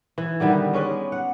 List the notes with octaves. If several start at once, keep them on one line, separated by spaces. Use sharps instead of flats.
E3
D3 D#3 G3 B3
B4
G#3 C#4 B4 D5
F#5